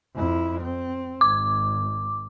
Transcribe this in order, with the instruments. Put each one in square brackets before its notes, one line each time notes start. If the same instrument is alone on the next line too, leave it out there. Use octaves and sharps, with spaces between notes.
[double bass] F2 E4
C4
[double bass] G#1 [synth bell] D6